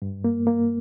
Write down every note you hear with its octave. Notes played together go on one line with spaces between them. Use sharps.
G2
A#3
A#3